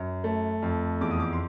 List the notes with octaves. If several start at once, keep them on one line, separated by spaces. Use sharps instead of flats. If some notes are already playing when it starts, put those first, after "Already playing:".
Already playing: F#2
A3
F2
E2 D6
D#6
D6
C6